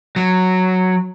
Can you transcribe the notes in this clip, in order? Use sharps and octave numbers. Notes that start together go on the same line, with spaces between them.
F#3